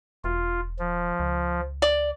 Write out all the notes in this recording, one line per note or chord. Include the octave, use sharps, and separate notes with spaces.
E1 F4
F3
C#2
D5